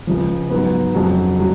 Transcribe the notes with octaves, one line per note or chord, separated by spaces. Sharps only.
C#2 C#3 F3
G#2 F#3 B3
F2 C#3 F#3
F#3